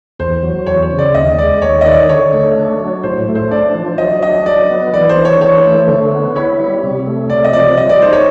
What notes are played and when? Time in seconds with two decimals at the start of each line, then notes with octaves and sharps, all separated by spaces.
0.19 E2 C5
0.43 F#3
0.66 E2 C#5
0.82 C#5
0.91 C#3
0.99 D5
1.14 D#2 D#5
1.38 G#3 D5
1.62 D#2 C#5
1.81 D#5
1.85 D#3 D5
2.09 D3 C#5
2.33 A3
2.56 D4
2.80 F#3
3.03 A2 C5
3.28 A3
3.35 C5
3.51 D4 D5
3.75 F3
3.98 F#3 D#5
4.22 D4 D#5
4.46 F#3 D5
4.70 B3
4.93 E3 D5
5.09 C5
5.17 D4
5.25 C#5
5.41 E3 C#5
5.65 A3
5.88 D3
6.12 B3
6.35 E4 C#5
6.60 G3
6.83 C3
7.06 A3
7.30 C3 D5
7.44 D#5
7.53 F3 D5
7.77 G3 D#5
7.89 D5
8.01 D#4 C5
8.12 C#5